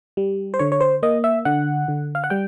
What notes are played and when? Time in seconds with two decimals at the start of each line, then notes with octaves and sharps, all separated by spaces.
0.17 G3
0.54 C5
0.59 D3 C#5
0.72 C#5
0.81 C5
1.03 A#3 D#5
1.24 E5
1.45 D3 F#5
1.88 D3
2.15 F5
2.24 F#5
2.30 G3 G5